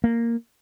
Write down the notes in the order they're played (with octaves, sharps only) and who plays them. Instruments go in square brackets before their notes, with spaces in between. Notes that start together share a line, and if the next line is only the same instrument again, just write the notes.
[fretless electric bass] A#3